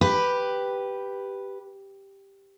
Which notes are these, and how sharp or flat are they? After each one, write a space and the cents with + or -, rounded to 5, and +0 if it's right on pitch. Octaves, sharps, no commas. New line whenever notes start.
G4 +0 B4 +0